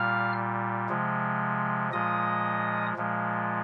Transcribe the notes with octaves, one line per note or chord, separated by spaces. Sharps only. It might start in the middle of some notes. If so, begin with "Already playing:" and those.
Already playing: A#2 G3 F5 F6
C3 F3 G#3
A#2 F3 G#3 D#5 D#6
A#2 F3 G#3